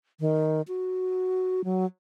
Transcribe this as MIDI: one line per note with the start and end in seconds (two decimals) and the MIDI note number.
0.20 0.61 51
0.68 1.61 66
1.64 1.86 54